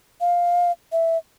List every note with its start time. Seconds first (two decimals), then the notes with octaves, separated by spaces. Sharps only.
0.21 F5
0.92 E5